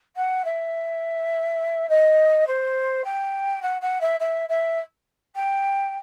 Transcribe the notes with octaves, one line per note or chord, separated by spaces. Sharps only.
F#5
E5
D#5
C5
G5
F#5
F#5
E5
E5
E5
G5